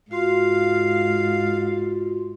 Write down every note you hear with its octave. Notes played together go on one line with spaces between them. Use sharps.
G#2 F4 F#4 F5 C6